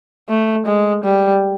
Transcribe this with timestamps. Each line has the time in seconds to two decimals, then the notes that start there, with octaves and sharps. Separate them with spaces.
0.29 A3
0.66 G#3
1.04 G3